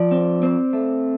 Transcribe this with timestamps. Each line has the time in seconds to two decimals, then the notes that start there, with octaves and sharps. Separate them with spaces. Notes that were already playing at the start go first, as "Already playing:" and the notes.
Already playing: F3 D5
0.11 C4
0.43 C4
0.73 A3